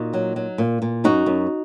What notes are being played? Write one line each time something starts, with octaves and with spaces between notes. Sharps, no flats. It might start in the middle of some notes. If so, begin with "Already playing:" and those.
Already playing: A#2 D#4 F#4
F#3
F#3
A#2
A#2
F#2 D#4 F#4
F#2